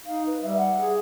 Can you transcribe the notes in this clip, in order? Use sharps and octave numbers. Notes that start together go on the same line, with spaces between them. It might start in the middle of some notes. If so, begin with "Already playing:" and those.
D#4 F5
B4
G3 E5
F#5
G#4